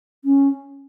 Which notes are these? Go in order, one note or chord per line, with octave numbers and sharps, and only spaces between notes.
C#4